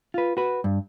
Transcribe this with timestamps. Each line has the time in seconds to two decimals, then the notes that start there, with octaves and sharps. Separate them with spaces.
0.14 F4 B4
0.37 F#4 B4
0.64 G2